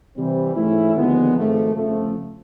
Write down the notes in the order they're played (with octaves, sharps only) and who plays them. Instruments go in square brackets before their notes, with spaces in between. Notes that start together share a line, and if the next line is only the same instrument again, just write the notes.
[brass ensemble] C3 E3 G3 C4
G#2 E3 A3 C#4 E4
D#2 D3 F3 G#3 B3
G#1 G#2 F3 A3
G1 F2 C#3 F3 A3